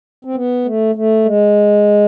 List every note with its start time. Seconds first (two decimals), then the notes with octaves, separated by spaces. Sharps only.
0.25 C4
0.35 B3
0.65 A3
0.95 A3
1.25 G#3